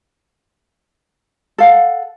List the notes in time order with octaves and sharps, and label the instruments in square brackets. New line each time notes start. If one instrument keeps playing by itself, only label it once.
[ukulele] A4 F5 F#5